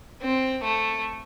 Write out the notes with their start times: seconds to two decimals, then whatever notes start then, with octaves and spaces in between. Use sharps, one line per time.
0.22 C4
0.64 A3